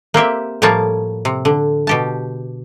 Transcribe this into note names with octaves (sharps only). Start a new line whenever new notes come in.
A#3 C4 G4 E5
A2 F3 G3 A#3 C#5 A5
C3
D3
B2 G4 A5